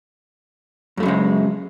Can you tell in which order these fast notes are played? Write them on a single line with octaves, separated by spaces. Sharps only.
F#2 A3 F#3 C#3 G#3